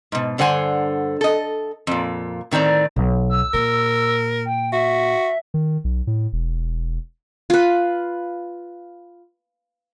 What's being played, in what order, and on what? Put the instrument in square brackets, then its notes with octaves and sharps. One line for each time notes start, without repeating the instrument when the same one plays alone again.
[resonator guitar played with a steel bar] G#2 B2
G2 D3 C5 F#5 G#5
A4 D#5
F2 A#2
A2 D#3 C4 D5 A#5
[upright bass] B1 B2
[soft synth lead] E6
[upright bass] A#2 [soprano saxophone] A#4
[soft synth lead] G5
[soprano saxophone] F#4 [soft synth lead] E5
[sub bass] D#3
B1
A2
E1
[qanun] F4 B4